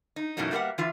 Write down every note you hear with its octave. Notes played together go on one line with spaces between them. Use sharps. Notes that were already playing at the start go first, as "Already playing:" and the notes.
D#4
F#2 B2 E3 F#3 A3 D#4
G3 A#3 B3 A#4 E5 F#5
E3 F4 E5